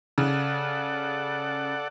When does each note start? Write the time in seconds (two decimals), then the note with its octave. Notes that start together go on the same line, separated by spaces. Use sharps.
0.18 C#3 A4 D5 F#5